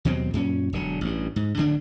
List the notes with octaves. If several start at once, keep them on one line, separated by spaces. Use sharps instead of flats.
D#2 B2 F#3 C4
F#2 A#2 C#4
E1 D3 F#3
A1 G2
G#2
D1 D2 D3 D4